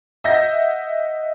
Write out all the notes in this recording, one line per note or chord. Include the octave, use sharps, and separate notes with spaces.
D#5 E5 F#5 G6 A#6